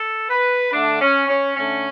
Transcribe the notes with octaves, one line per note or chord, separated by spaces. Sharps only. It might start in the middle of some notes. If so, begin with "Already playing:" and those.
Already playing: A4
B4
D3 A3 D4
C#4
C#4
D3 A3 C#4